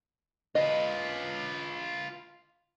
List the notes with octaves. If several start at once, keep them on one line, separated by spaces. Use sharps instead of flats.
F4 B4 D#5